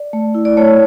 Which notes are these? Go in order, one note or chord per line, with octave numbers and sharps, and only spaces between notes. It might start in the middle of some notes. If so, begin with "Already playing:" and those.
Already playing: D5
A3
E4
D5
A3 C#5